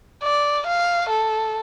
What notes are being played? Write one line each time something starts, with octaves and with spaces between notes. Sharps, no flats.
D5
F5
A4